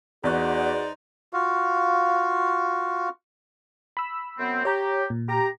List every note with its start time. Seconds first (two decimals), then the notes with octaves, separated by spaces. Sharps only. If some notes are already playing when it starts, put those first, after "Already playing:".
0.24 E2 D#4 F#4 G#4 C5 D5 C#6 F#6
1.33 F4 F#4 F5
3.97 B5 E6
4.39 F#2 B3 C4
4.65 G4 C#5 A#5
5.10 A#2
5.29 G4 A#5